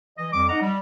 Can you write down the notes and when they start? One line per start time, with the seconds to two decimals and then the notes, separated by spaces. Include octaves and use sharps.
0.18 E3 D#5
0.33 F2 G3 D6
0.49 D#4 D#5 F#5 A#5
0.62 G3